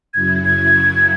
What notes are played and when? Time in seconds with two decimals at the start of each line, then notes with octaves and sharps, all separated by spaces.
0.14 F#2 C#3 F#3 E4 G#6
0.45 G#6